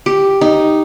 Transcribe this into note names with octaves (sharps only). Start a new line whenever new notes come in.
G4
D#4